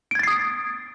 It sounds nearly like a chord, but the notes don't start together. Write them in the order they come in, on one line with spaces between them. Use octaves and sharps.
D7 G#6 A6 C7 D#6